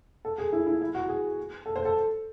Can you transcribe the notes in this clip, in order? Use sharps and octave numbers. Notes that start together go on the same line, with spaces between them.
A4
G#4
E4
E4
E4
F#4
G#4
A4
C5
A4